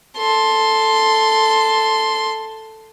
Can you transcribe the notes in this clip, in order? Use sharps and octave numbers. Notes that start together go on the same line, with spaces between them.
A4 C6